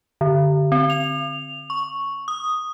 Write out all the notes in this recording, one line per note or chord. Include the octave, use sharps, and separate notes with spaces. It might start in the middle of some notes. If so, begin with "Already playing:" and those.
D3
C4
F7
C#6
D#6